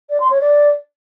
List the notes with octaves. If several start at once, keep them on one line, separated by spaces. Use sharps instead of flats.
D5
C6
C#5
D5